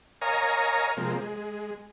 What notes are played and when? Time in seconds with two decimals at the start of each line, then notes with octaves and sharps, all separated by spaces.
0.21 A#4 C#5 D#5 F5 G#5 A#5
0.97 C3 F3 G#3 A#3
1.15 G#3